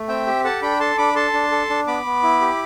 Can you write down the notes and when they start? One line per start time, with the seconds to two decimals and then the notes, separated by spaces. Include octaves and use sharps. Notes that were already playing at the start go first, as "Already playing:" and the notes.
Already playing: A3
0.08 C4 E5 G5
0.27 G4
0.44 A4 F#5 A5
0.62 D4 G5 B5
0.80 A4 A5 C6
0.98 D4 B5 D6
1.15 A4 A5 C6
1.33 D4
1.51 A4
1.70 D4
1.87 B3 B5 D6
2.06 B3
2.23 E4
2.41 G4